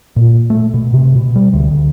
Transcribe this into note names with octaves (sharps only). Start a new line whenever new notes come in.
A#2
A3
B2
C3
B2
G3
D2
D2